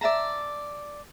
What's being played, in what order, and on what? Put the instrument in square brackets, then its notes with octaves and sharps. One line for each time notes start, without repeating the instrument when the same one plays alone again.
[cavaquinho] D5 E5 A5 A#5